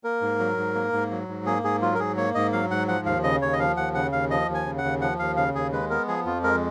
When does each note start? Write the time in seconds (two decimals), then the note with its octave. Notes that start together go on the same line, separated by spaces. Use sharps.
0.04 A#3 A#4
0.22 G#2
0.39 F#3
0.57 G#2
0.75 A#3
0.93 G#2
1.11 F#3
1.28 G#2
1.46 A#3 G#4
1.64 G#2 G#4
1.82 F#3 F4
1.95 A#4
1.99 G#2 G#4
2.17 A#3 C#5
2.35 G#2 D#5
2.53 F#3 F5
2.70 G#2 F#5
2.88 F3 F#5
3.06 D#2 F5
3.24 C#3 D#5
3.42 D#2 C#5
3.53 D#5
3.59 F3 F5
3.77 D#2 F#5
3.95 C#3 F#5
4.12 D#2 F5
4.30 F3 D#5
4.48 D#2
4.54 G#5
4.66 C#3
4.78 F#5
4.84 D#2
5.01 F3 F#5
5.19 D#2 F5
5.37 C#3 F5
5.54 D#2 G#4
5.72 G#3 B4
5.90 B3 A#4
6.08 F3 G#4
6.26 F2 F4
6.43 G#3 A#4